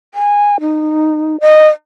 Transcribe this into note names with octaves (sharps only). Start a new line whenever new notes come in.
G#5
D#4
D#5